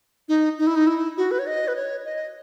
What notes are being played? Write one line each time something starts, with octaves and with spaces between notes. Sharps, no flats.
D#4
D#4
E4
D#4
E4
F#4
B4
C#5
D#5
B4
C#5
D#5